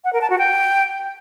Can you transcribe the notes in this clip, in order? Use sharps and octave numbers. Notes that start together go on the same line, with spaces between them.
F#5
A#4
A5
F#4
G5